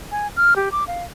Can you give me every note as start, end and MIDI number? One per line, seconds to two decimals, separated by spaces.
0.12 0.28 80
0.37 0.54 89
0.56 0.71 67
0.72 0.84 86
0.87 1.04 77